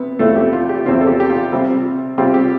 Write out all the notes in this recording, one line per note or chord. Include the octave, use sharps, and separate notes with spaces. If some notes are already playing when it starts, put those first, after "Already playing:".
Already playing: C3 B3
E2 C3 F3 A3 C4 E4 A4
G4
F4
G4
E2 C3 F3 C4 E4 F4
A4
G4
G4
F4
C3 G3 C4 F4
C3 G3 C4 F4 G4
G4